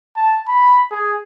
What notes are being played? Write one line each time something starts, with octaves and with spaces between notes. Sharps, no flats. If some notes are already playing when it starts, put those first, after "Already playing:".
A5
B5
G#4